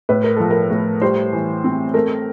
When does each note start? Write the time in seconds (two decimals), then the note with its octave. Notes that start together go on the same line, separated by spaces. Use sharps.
0.09 A2 B4
0.24 A#4
0.37 F3 A4
0.50 A#4
0.71 A2
1.01 G3 C5
1.33 E3
1.64 C4
1.94 A3 A#4